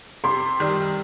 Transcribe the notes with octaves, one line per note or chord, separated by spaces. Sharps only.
C3 C6
D#3 G3